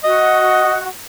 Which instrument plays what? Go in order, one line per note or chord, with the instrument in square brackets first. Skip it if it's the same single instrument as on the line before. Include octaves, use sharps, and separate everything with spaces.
[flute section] F#4 [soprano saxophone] D#5